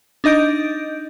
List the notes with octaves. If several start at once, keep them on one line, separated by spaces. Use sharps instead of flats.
D4 D#4 D#5 G6 D7